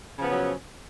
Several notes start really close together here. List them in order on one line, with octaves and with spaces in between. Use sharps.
C#3 F3 B3 C#4 F#3